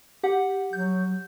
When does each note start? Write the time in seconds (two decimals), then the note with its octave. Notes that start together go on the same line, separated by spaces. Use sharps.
0.23 G4 F#5
0.73 F#3 G6